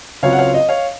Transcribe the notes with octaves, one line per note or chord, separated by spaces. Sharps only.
C#2 C#3 F#3 C4 F4 C#5 F5
F#5
C#5 F5
D#5
C#5 F5